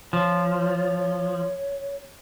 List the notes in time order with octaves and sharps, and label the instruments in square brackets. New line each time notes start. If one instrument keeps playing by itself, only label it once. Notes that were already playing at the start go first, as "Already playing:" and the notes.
[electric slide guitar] F3 [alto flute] C#5